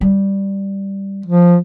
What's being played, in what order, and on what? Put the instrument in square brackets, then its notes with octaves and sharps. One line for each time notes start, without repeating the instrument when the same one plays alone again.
[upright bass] G3
[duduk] F3